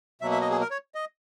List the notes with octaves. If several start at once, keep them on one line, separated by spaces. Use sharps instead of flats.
B2 F#3 A#3 E5
E5
D#5
G#4
A#4
C#5
D#5